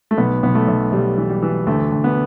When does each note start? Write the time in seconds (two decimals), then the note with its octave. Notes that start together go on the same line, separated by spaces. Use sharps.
0.11 A3
0.18 B1 B3
0.43 B1 B3
0.55 A3
0.68 B1
0.92 B1 G3
1.17 E3
1.29 G3
1.42 E3
1.67 D2 A3
1.92 D2
2.04 B3